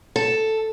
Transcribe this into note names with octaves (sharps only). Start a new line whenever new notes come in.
A4